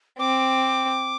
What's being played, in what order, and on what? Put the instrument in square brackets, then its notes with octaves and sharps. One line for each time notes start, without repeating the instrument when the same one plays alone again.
[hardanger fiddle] C4 [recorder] D6